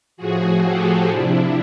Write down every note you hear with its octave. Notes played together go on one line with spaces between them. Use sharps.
A2 F3 F#4 G#4
G4 A4
C3 F3 D4 E4